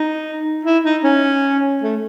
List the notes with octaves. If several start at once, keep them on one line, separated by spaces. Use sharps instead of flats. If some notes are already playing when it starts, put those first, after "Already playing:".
Already playing: D#4
E4
D#4
C#4
A3